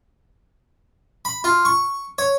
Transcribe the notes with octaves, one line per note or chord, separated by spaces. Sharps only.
B5
F4
C#6
C#5